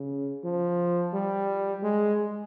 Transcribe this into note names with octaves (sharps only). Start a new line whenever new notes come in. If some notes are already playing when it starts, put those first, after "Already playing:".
Already playing: C#3
F3
G3
G#3